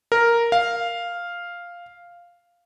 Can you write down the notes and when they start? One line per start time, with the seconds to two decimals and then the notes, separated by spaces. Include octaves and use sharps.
0.12 A#4
0.52 F5